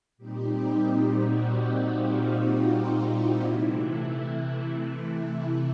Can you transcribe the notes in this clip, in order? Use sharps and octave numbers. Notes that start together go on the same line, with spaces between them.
A#2 G3 C4 D#4 G4
F#4
F4
D#4
E4
C3 E3 A3